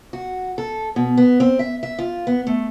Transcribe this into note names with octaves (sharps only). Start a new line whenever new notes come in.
F#4
A4
B2
B3
C4
E5
E5
F4
B3
A3